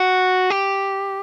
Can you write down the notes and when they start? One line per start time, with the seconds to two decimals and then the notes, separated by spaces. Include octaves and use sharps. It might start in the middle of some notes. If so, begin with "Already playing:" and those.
Already playing: F#4
0.50 G4